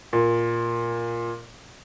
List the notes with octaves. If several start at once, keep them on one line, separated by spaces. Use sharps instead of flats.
A#2